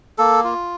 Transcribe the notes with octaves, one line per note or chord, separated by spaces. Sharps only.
A#3 A4
F4